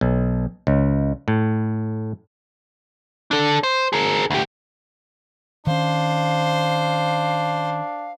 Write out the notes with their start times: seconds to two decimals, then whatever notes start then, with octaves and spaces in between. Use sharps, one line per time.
0.01 B1
0.67 C#2
1.28 A2
3.31 D4 A4
3.63 C5
3.93 G#4 A#4
4.30 D2 G4
5.67 D#3 C#4 D4 C5 F5